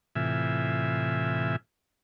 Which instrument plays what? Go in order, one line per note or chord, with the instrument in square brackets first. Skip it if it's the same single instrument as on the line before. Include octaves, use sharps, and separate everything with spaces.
[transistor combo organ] A2 C3 E3 F4 E5 G#5